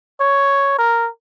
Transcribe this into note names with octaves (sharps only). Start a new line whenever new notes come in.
C#5
A#4